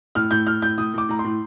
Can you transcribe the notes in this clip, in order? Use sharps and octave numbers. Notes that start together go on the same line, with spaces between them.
A2 F6
A2 G6
A2 F6
A2 G6
A2 D#6
A2 D6
A2 A#5
C6
A2